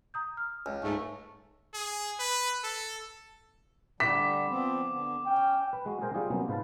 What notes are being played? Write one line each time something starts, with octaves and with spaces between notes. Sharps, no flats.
A#5 D#6 G6
F6
C#2
G#2 A3
G#4
B4
A4
D3 G3 D6 B6
F3 B3 C4
D3 B3
C#4 G5
B4
G#3 F#4
G#4 A#4 C5 G5 G#5 A#5
G3 G#3 F4 G4 G#4
C3 F#3 A#3 B3 C#4
G#2 F4 B4 C5 F5 A5